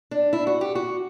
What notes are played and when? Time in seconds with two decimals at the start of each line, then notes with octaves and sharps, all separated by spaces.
0.11 D4
0.33 E4
0.47 F#4
0.61 G4
0.75 F#4